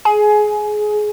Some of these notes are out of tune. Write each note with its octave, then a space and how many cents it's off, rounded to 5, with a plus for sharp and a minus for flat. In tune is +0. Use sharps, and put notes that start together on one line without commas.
G#4 +20